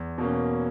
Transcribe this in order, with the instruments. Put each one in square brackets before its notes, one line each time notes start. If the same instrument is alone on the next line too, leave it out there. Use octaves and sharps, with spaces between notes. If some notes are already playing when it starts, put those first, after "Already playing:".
Already playing: [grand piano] E2
B2 A#3 C#4